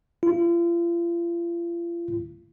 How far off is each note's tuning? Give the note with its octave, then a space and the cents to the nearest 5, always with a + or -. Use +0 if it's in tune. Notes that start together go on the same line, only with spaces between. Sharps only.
F4 -40